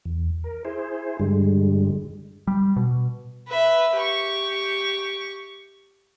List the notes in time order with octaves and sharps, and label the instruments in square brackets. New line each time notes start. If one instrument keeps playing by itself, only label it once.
[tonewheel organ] E2
A#4
E4 G#4 C5
G2 D3 G3 G#3
[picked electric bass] G3
B2
[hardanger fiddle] B4 E5
G4 C#6